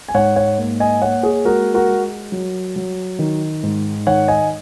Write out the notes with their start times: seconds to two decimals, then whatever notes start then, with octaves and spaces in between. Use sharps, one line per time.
0.08 G#5
0.14 G#2 C#5 F#5
0.36 C#5 F#5
0.58 A#3
0.80 D#5 G#5
1.02 A#3 C#5 F#5
1.23 G#4 C#5
1.45 G#3 F#4 A#4
1.74 F#4 A#4
1.89 G#3
2.32 F#3
2.76 F#3
3.19 D#3
3.63 G#2
4.06 D#3 C#5 F#5
4.28 D#5 G#5